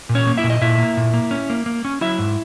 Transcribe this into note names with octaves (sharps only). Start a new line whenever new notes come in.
A#2
C#4 C#5
A#3
E4 E5
A#2
D#5
A#2 E4 E5
A#3
A#2
A#3
C#4
A#3
A#3
C#4
F#3 E4 E5
G#2